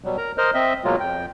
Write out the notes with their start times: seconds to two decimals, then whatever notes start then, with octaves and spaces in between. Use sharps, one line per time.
0.04 B2 F#3 G3
0.17 A#4 A#5
0.38 A#4 C5 D#5 F6
0.54 C4 D#5 E5
0.84 B2 F#3 G#3 A#3 F4
1.00 F2 G5